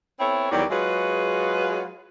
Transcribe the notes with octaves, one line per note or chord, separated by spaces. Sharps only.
B3 C4 E4 A4 C#5
E2 D#3 F#3 G3
F#3 G#3 F4 F#4 G#4 B4